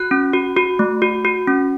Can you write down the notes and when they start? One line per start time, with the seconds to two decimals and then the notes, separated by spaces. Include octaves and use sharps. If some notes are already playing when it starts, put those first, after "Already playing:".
Already playing: F#4 F#6
0.11 C#4
0.34 F#4
0.57 F#4
0.79 A3
1.02 F#4
1.25 F#4
1.48 C#4